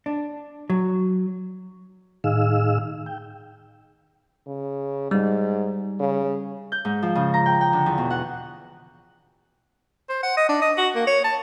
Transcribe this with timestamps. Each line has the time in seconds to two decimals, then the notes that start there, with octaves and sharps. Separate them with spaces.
0.06 D4
0.70 F#3
2.24 A2 D#3 D#4 G#4 F5 E6
3.06 G5
4.47 C#3
5.11 G#2 G3
6.00 C#3
6.72 G6
6.85 G#2
7.03 F3
7.15 C#3
7.34 A#5
7.46 G5
7.61 G5
7.73 D3
7.86 E2
7.98 B2
8.10 F#5
10.09 C5
10.23 F#5
10.37 D#5
10.49 D4
10.62 D#5
10.78 F#4
10.95 A#3
11.07 C#5
11.24 A5